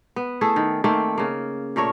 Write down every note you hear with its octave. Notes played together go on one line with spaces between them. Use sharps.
B3
A3 E4 G#4 A4
D#3
D#3 A3 A#3 C4
C#3 A#3
A#2 A3 A#4 C#5